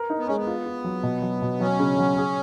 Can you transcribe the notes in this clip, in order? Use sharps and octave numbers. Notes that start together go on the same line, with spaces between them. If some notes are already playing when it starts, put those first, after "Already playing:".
Already playing: A#4 B4
D#4
B3
G#3 C#4
B3
F4
F4
F#3
B2
F#3
B2
F#3 C#4
C#3
F#3
G#4